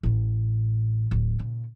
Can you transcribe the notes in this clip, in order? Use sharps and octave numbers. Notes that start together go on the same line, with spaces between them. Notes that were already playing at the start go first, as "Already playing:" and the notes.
A1 A2
D1
A#2 C#3